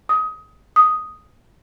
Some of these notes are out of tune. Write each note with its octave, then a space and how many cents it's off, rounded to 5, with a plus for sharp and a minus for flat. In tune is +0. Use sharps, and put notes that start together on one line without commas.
D#6 +20
D#6 +0